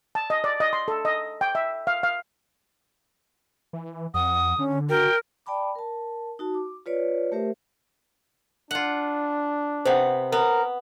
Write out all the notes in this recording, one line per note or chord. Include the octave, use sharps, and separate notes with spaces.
A5
D#5
D5
D#5
C6
A4
D#5
G5
E5
F5
F5
E3
F2 F#5 D#6
D3 C#4
F#4 A#4 G5
D5 G5 A5 B5 D6
A#4 A5
D#4 F#4 A5
D6
F4 B4 C#5 D5
A3 G4 A#4 C5 E5
D4 F4 F#5
C3 B3 C5 F#5
B3 A#4